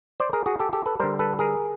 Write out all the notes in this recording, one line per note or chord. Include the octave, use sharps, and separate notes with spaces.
C5 D5
G#4 A#4
F#4 G#4
G4 A4
G4 A4
A4 B4
D3 G3 A#4 C5
A4 B4
G#4 A#4